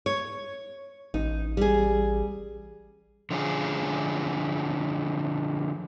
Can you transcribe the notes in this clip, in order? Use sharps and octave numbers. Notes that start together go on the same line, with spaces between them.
C#5
A1 D#4
G3 G#4
D3 F3 C#4 G#4